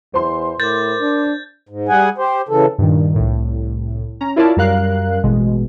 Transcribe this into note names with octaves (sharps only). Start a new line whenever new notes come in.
E2 C5 C6
A2 A#4 D6 G6 A6
D4
G#2
G3 G#4 F#5 G#5
G4 C5
C#3 E3 A4
G2 A#2 D#3
C2 A2
C#4 A#5
E4 F4 A#4 C#5 D5 A5
F#2 G3 A#4 F5 F#6
A1 B2 G#3